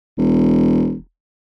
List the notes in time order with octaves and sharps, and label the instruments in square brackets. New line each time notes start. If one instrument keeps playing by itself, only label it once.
[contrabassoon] E1